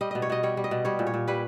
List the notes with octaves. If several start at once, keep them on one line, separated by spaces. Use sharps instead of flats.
G3 D#5
B2 D#5
C#5
B2 D#5
G3 C#5
G3
D#5
B2
G3 C#5
A#2
C#5
A#2
G3 B4